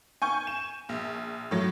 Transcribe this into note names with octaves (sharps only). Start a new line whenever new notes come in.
G#5 C#6 G6
E7
A#1
A2 F#3